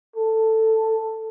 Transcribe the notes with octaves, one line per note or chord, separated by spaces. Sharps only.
A4